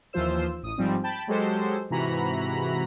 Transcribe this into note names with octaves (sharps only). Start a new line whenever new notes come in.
D#2 E3 F3 F4 C5 E6
A1 D#6
G#2 F3 G3 C4
G5 A5 B5
F#3 G#3 G4 A4 C5
G#2 C3 E3 F#4 A#5 B5